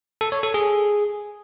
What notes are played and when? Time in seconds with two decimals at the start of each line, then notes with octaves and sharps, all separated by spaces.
0.21 A4
0.32 C#5
0.43 A4
0.54 G#4